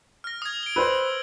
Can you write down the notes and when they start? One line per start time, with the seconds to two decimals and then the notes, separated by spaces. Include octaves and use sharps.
0.24 F6 A#6
0.42 D#6 G#6
0.63 D7 G7
0.76 B4 C5 E6